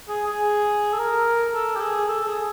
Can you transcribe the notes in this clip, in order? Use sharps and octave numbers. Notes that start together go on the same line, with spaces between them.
G#4
G#4
A4
A#4
A4
G4
G#4
A4
G#4